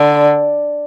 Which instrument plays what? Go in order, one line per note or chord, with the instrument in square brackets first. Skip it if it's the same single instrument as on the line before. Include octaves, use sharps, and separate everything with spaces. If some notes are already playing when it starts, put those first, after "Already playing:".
Already playing: [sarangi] D3